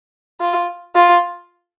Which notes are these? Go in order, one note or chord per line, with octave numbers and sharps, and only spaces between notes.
F4
F4